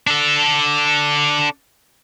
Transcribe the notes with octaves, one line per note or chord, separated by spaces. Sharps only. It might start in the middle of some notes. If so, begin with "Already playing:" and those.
D4 A4